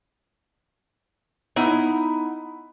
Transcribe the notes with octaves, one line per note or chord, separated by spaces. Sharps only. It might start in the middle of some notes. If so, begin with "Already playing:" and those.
B3 D#4 E4